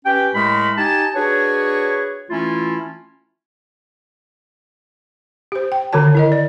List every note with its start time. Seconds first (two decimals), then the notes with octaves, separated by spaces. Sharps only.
0.05 C#4 G4 B4 G5
0.35 A2 G#3 A3 A#4 B5
0.78 D#4 G4 G#5 A5
1.15 D4 F#4 G#4 B4 C#5
2.30 E3 A3 C#4 E4 F4
5.52 G4 C5
5.72 G5
5.93 D3 D#3 F#4 C#5 A5
6.15 E4 A#4 D#5
6.32 D5